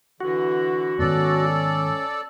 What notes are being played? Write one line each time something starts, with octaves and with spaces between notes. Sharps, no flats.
D3 E3 F#4
G#2 D#3 B3 C#4 A4 D5